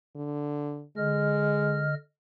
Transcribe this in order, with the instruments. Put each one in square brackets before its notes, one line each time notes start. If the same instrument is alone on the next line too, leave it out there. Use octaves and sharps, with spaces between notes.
[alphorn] D3
[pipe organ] D3 D#5 F6 [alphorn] G#3